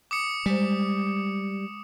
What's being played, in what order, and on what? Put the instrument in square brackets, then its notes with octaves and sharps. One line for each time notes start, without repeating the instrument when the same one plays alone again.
[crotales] D6 D#6 C#7
[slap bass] G3 [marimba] G#3 C5